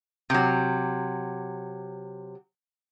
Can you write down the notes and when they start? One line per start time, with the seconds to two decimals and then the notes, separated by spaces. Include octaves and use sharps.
0.30 C3 F#3